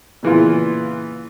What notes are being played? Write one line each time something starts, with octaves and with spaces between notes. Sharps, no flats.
A#2 C#3 E3 B3 E4 F4